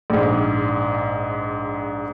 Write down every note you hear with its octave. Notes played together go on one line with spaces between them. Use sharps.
A#1 G#2